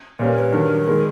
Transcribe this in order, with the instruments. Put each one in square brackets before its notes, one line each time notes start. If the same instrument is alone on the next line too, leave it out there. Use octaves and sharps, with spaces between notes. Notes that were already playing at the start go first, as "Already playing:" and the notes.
[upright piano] A#2 G3 A#3 C#4 [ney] B4
[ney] A#4
B4
[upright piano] G2 D#3 F#3 [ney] A#4
[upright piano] D#3 G#3